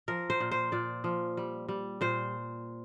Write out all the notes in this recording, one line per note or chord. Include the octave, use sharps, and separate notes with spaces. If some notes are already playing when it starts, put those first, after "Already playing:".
F3 A#4
C5
A#2
C5
A#2 D5
F3
G3
G3
A#2 C5